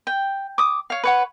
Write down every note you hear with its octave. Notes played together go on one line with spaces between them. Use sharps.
G5
D6 D#6
C#5 F5
B4 C#5 F#5